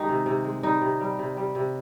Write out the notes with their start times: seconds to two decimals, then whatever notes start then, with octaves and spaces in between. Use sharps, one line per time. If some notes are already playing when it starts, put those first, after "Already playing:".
Already playing: D#3 G#3 D#4 G4
0.09 C3
0.26 C3
0.44 G#3
0.63 G3 D#4
0.81 C3
1.00 G3
1.19 C3
1.37 G3
1.55 C3